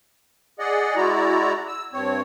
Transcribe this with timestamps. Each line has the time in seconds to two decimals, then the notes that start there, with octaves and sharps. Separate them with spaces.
0.59 G#4 D5 D#5 F#5
0.96 G#3 E4 F#4 D5 A#5
1.67 E6
1.93 G2 C4 C#5